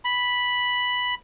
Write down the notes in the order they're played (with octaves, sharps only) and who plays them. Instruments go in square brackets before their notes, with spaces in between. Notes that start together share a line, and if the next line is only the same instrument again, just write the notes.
[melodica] B5